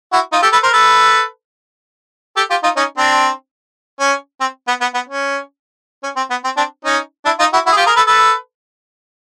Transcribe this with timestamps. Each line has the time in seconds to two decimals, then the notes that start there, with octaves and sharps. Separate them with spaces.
0.13 E4 F#4
0.32 D#4 F4
0.42 G4 A4
0.52 A4 B4
0.63 A#4 C5
0.73 A4 B4
2.37 G4 A4
2.50 F4 G4
2.63 D#4 F4
2.77 C#4 D#4
2.98 C4 D4
4.00 C#4
4.41 C4
4.68 B3
4.81 B3
4.95 B3
5.09 C#4
6.03 C#4
6.17 C4
6.30 B3
6.45 C4
6.57 C4 D4
6.85 C#4 D#4
7.25 D4 E4
7.39 D#4 F4
7.53 E4 F#4
7.66 E4 F#4
7.72 G#4
7.77 F4 G4
7.86 G#4 A#4
7.97 A4 B4
8.07 A4 B4